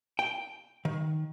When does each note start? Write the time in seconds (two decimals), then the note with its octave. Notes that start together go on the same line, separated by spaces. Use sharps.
0.19 G5
0.85 D#3